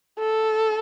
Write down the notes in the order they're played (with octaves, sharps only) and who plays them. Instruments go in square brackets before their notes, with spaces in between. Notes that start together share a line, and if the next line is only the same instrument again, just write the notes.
[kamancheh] A4